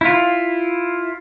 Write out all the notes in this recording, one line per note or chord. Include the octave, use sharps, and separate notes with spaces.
E4 F4